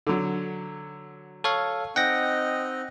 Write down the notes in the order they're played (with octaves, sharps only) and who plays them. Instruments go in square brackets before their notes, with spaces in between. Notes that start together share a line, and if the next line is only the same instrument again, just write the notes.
[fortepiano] D3 F#3
[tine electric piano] A4 C#5 F5
[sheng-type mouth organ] C4 D#4 D#5 [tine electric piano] F#5 G5 A#6